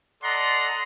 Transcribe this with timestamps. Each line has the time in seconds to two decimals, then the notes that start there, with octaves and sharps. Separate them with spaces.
0.23 A4 D5 D#5 F#5 A#5 C6